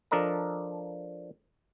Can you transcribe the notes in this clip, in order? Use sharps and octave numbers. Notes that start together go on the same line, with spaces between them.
F3 D4 A4 A#4 D#5 A#5